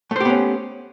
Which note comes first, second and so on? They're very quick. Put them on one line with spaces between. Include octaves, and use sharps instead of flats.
A3 C5 G4 B3 C#4